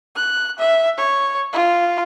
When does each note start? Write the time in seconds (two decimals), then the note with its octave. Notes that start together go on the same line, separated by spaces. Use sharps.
0.16 F#6
0.59 E5
0.98 C#5
1.53 F4